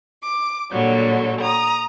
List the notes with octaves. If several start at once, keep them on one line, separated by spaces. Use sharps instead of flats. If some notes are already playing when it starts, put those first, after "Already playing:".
D6
A#2 D3 F#3 G3
A#5 D#6